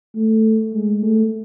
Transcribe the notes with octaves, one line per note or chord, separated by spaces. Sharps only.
A3
G#3
A3